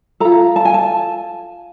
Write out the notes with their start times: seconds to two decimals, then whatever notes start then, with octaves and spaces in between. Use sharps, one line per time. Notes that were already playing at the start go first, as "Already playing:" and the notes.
0.20 F4 A4 A#5
0.56 A5
0.65 G#5
0.74 A5